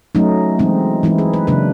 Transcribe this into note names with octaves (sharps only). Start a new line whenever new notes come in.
F#3 A3 C#4 D#4
E3 G#3 C4 D#4
E3 G#3 C4 D#4 E4
G#4
B4
C#3 F#3 A#3 D4 B4